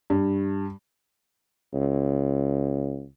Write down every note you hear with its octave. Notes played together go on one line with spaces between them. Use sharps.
G2
C#2